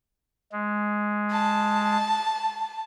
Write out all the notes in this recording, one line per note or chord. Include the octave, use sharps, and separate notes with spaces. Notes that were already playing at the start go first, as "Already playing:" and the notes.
G#3
A5